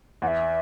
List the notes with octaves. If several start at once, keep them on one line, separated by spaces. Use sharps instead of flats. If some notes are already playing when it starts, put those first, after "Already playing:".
E2 F#5
E5